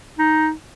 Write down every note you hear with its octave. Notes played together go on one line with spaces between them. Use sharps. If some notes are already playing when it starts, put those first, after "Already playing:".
D#4